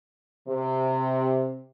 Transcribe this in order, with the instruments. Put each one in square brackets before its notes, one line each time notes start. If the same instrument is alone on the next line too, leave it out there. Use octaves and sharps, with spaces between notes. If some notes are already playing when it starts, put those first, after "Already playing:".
[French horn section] C3